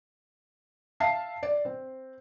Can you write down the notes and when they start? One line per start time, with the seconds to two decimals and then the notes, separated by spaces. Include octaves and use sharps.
1.00 E5 F5 A5 C7
1.43 D5
1.65 C4